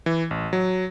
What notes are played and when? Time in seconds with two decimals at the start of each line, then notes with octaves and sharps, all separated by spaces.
0.06 E3
0.31 A1
0.53 F#3